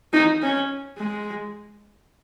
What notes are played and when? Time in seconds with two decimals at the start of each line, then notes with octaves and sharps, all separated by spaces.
0.13 D#4
0.42 C#4
0.98 G#3